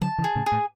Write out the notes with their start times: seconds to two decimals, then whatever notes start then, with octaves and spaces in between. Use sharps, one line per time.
0.01 D3 F#3 A5
0.18 C#3 E3
0.24 G#4
0.35 A2 C#3
0.46 G#4
0.52 A2